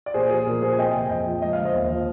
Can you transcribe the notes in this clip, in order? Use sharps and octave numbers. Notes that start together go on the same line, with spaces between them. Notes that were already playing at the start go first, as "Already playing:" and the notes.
D5
A#2 G#4 C5
F3 G#4
A#2 A#4
A#3 G#4 C5
G#5
C4 D#5 G5
C3
F2 D#5 G5
F3
G#3 D#5
D3 F5
C5 D#5
D#2
F3